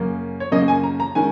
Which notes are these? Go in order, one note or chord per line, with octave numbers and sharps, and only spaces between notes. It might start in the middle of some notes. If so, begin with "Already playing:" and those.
Already playing: F#2 C#3 A#3 C#4
C#5
F#2 C#3 A#3 C#4 D#5
G#5
A#5
A#5
D#3 G#3 C#4 G#5